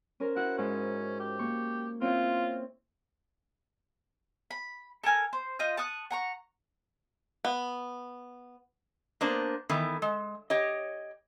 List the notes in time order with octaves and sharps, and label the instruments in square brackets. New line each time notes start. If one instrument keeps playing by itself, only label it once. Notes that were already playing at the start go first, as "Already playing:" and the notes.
[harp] C#4 A#4 C5
[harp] E4 F#4 [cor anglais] F#5
[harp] G#2 [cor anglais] C#4
[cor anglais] G4
[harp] A#3 C#6
[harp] C4 C#4 E4 [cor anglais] F4
[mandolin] B5
A4 A#4 G#5 F6
C5
F4 D#5 G6
A5 C#6 D#6 F#6
F#5 A#5 C#6
[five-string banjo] B3
[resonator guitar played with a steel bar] A#3 B3 D4 C5 D5
D#3 E3 A3 B3
G#3
G4 C#5 D#5